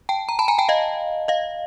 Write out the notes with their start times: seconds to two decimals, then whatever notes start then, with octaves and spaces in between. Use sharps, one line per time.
0.09 G5 A5
0.29 A#5
0.39 A5 B5
0.48 G#5 A#5
0.58 G5 A5
0.69 D#5 F5
1.28 D#5 F5